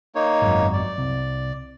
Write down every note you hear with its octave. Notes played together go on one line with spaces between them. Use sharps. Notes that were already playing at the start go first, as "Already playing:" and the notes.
A#3 D#4 C#5
G#1 F#2
D5
C2